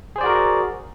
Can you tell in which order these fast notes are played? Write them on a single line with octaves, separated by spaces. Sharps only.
G#4 C5 D5 F#4 A#4